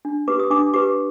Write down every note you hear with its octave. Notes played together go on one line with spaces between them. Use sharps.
D4
G4 B4 D6
D#6
D4 D6
G4 B4 D6